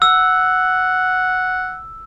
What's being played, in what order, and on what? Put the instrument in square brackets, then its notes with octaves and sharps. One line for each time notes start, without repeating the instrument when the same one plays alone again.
[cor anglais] F#5 [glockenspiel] E6